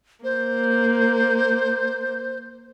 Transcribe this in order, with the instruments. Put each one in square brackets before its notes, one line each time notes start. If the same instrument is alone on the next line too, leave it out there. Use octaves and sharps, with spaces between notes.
[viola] A#3 [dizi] C5